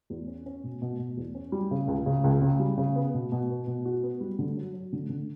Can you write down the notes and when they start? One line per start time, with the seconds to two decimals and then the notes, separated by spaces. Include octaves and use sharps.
0.10 E2
0.27 C#4
0.46 C#4
0.64 B2
0.82 B2
0.99 B2
1.17 E2
1.35 C#4
1.52 G3
1.71 C#3
1.88 C#2
2.06 C#3
2.24 C#2
2.41 C#3
2.59 G3
2.77 C#3
2.96 B3
3.14 B2
3.32 B2
3.49 B3
3.67 B2
3.85 F#4
4.03 B3
4.21 G3
4.39 D3
4.57 F#3
4.74 F#3
4.93 D3
5.09 D3